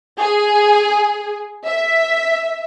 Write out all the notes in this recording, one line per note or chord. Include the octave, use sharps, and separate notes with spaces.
G#4
E5